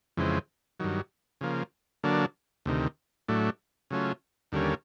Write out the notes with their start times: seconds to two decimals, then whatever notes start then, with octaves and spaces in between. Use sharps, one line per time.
0.17 F2 C#3 E3 G#3 C4
0.80 G2 D#3 F#3
1.41 C#3 F3 A#3
2.04 D3 F#3 A#3 D4
2.66 D2 C3 D#3
3.28 A2 F#3 A3 D4
3.91 C#3 F#3 A3 C#4 F4
4.52 D#2 D3 G3 A#3 C#4